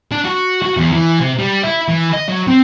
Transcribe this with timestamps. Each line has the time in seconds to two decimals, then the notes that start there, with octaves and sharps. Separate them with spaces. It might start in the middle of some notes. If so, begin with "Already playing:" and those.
0.11 D4
0.25 F#4
0.62 F#4
0.77 E2
0.92 E3
1.20 C3
1.39 G3
1.63 E4
1.88 E3
2.13 D#5
2.28 F#3
2.47 C4